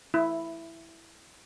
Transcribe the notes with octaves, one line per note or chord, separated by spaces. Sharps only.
E4